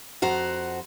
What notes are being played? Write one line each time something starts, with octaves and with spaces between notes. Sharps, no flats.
F2 F#4 C5 A#5